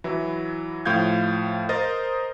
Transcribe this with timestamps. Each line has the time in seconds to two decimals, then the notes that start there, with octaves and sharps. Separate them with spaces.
0.04 E3 F#3 E4
0.85 A2 F3 F5 G6 G#6
1.69 A#4 C5 D#5 D#6 A6